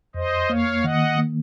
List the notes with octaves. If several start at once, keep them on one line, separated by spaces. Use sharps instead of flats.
F2 C5 D#5
A#3 C#5 F5
D#3 D#5 F#5
A#3